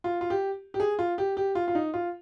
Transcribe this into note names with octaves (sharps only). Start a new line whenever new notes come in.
F4
F4
G4
G4
G#4
F4
G4
G4
F4
F4
D#4
F4